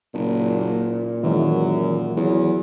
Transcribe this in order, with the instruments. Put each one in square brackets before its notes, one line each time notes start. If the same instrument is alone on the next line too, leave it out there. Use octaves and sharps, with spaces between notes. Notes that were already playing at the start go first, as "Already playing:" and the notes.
[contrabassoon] F#1 [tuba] A#2
[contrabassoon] F#2 [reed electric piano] D#3 E3 G#3
[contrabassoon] E2 [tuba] F#3